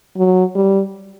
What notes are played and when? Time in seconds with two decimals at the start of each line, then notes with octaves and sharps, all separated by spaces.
0.17 F#3
0.55 G3